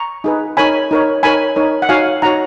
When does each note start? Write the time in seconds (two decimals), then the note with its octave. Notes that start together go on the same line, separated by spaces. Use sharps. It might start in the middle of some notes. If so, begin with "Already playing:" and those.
Already playing: A#5 C#6
0.24 D#4 G#4 B4
0.57 D#4 A#4 C#5 G#5 B5
0.91 D#4 A#4 C#5
1.23 D#4 A#4 C#5 G#5 B5
1.56 D#4 A#4 C#5
1.82 F#5
1.89 D#4 F#4 C#5 F5 G#5
2.22 D#4 F#4 C#5 F#5 A#5